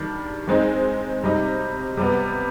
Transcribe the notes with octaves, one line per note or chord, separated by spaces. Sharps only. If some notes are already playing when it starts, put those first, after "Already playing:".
Already playing: D#3 G3 D4
D#3 G#3 C4 D#4
C3 G3 C4 D#4
C3 G3 B3